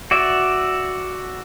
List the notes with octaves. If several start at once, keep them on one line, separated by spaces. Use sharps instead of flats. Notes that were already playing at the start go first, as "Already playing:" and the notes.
F#4 D5 E5